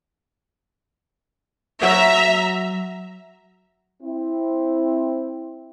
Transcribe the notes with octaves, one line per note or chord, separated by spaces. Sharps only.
F#3 F#4 E5 A#5
C4 E4